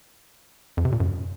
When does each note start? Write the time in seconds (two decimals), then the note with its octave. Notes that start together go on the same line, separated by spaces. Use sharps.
0.77 F2
0.85 C3
0.92 A#2
1.00 F#2